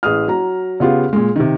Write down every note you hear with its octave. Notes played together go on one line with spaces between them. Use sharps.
A1 G#4 D#6 F6
F#3 A#5
C#3 B3 F4 G4 G#4
A#2 G#3
C3 D#3